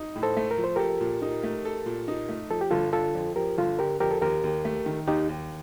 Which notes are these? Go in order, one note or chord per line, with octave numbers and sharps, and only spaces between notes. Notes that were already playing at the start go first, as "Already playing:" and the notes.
Already playing: D#4
A2
A4 C5
A3
A#4
F3
C5
G4 A4 A#4
A#2
D#4
A3
A4
A#2
D#4
A3
F3 A4
G4
G1 F4 A4
D3 F4 A4
F2
F3 G4 A#4
G1 F4 A4
D3 G4 A#4
F2 G4 A#4
A4
D#2 G4 A#4
D#2
A3
D#3
D#2 D#4 G4
D#2